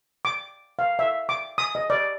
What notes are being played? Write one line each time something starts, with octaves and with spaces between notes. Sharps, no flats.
D6
F5
E5
D6
D#6
D#5
D5